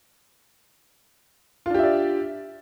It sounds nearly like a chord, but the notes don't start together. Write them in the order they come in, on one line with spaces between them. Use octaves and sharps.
F4 D4 G4 E5 D5